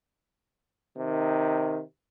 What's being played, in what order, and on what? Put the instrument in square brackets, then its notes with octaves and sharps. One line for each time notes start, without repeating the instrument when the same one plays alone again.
[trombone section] C3 D#3